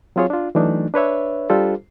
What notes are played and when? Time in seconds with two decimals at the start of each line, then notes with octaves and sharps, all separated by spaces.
0.16 F#3 C4 F4 G#4 C#5
0.30 D4 F4
0.55 E3 F#3 A3 D4 D#4
0.94 D4 B4 C#5 E5
1.50 G3 D4 F4 G4 A4 C5